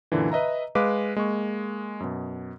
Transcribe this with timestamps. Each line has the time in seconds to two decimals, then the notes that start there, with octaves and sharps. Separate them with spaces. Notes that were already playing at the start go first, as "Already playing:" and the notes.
0.12 F#2 A#2 D3 E3
0.32 B4 D#5 E5 A#5
0.75 G#3 B4 F5 D6
1.16 G#3 A#3 C#6
2.00 F#2 B2